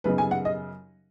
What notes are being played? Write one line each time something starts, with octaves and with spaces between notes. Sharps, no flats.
F#2 C#3 B3 D#4 B4
G#5
F#5
D#5